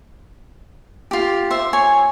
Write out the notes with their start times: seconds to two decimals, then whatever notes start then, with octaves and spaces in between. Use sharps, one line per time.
1.11 F4 G4
1.51 C5 E5
1.73 C#5 G#5